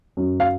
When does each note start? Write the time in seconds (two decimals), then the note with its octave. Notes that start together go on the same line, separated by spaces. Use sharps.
0.17 F#2
0.40 F5